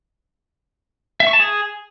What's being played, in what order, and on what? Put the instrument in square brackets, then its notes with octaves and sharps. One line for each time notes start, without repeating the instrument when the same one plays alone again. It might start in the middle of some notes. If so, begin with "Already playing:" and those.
[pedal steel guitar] E5
C#6
A5
G#4